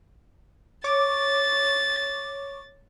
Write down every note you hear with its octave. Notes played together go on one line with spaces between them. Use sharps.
C#5 C#6 D6 A6